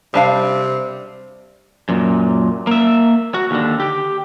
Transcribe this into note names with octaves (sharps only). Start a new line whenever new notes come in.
C3 G3 D4 F5
F#2 A#2
A#3 E5
F#4
D#2 D3
G4